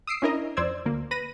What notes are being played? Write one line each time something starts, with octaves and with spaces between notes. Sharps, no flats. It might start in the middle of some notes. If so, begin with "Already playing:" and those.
D#6 E6 C7 D7
C#4 D4 E4 A#4 D#5 A#5
F2 C5 D5 E6 G#6
D2 A#3
B4 B5 A#6 D#7